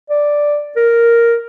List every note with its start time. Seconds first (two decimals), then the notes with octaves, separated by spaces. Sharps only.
0.10 D5
0.77 A#4